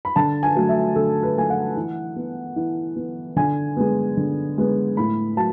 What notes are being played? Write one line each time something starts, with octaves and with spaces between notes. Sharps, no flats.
B5
D3 A5
G#5
F#3 A3
E5
D3 A4
B4
F#3 A3 G#5
F#5
E3
B3
E3
B3
D3 G#5
G#3 B3
D3
G#3 B3
A2 B5
F#3 A5